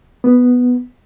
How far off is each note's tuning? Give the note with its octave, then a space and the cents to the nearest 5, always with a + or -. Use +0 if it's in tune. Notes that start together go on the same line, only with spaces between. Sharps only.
B3 +0